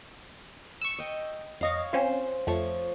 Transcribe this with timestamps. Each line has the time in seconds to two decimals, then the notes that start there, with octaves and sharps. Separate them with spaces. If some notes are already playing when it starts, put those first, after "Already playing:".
0.82 C#6 E6
0.99 D#5 G5
1.61 F2 C#5 D#5 F5 A#6
1.93 C4 C#4 F4 C5
2.47 F2 F3 A3 C#5